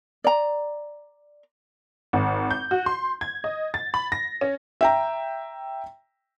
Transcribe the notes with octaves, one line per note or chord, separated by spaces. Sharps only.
D5 A#5
G#1
G6
F#4
C6
G#6
D#5
A6
B5
A#6
C#4
E5 G5 A#5